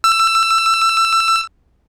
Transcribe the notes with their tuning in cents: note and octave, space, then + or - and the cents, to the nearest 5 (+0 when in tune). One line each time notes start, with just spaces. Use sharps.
E6 +20